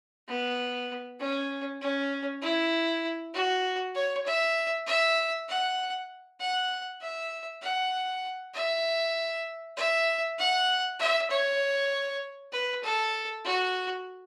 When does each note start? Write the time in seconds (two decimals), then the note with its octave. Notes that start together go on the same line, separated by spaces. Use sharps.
0.29 B3
1.20 C#4
1.81 C#4
2.42 E4
3.34 F#4
3.95 C#5
4.26 E5
4.87 E5
5.49 F#5
6.41 F#5
7.02 E5
7.62 F#5
8.54 E5
9.77 E5
10.39 F#5
10.99 E5
11.31 C#5
12.52 B4
12.84 A4
13.45 F#4